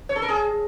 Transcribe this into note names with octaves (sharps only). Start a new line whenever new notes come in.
C#5
A4
A#4
G#4